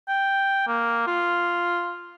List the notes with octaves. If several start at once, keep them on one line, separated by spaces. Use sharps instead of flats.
G5
A#3
F4